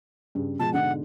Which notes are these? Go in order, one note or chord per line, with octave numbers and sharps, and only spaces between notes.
G2 C#3
B2 F3 G#3 A5
G#2 B2 D3 F#5